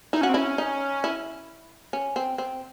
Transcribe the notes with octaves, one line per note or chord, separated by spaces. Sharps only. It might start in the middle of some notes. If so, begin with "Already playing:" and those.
D#4 E4
C#4 F#4
C4
C#4 E4
D#4
E4
C#4
C4
C4